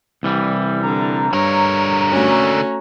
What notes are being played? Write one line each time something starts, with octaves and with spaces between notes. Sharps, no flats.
C2 E3 G3
D3 A#5
G2 D3 A#4 C#5
A3 C#4 F#4